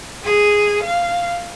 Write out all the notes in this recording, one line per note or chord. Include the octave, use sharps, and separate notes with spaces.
G#4
F5